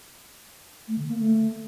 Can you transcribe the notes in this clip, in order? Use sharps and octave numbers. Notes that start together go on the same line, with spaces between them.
A3
D3
A#3
A3